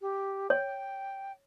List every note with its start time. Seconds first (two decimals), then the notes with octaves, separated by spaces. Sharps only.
0.01 G4
0.50 C#5 G5